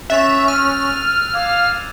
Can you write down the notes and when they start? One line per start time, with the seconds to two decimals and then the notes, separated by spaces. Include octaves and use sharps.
0.10 C#4 E5 F#6 A6 F7
0.48 E6 F6 D#7
1.34 F5 D6 G#6 F7